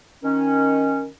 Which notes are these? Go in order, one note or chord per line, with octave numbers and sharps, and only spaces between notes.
D#3 C#4